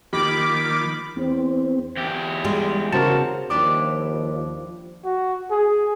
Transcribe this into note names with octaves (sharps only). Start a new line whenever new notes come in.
D#3 F3 A#3 G4 B5 D6
E2 C4
E2 G4
G3 G#3
C#3 F#4 A#4 C5 A5
D#2 F3 G3 D4 E4 D6
F#4
G#4